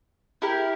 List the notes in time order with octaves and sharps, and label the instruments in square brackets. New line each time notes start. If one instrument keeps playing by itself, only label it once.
[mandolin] E4 G4 A#4